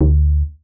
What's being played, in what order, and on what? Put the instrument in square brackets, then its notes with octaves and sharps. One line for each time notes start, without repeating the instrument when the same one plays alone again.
[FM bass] D2